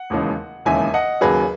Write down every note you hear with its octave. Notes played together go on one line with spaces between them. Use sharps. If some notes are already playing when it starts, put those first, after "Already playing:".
Already playing: F#5
E1 D#2 C#3 E3 G#3
E1 D#2 C#3 E3 G#3 E5 G#5
D#5 F#5
D#2 C#3 F#3 G#4 B4